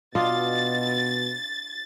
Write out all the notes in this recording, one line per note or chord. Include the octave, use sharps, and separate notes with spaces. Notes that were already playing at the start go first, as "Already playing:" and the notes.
B2 D4 F4 D#5 A6